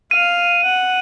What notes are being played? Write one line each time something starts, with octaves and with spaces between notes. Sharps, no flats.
F5 D#7
F#5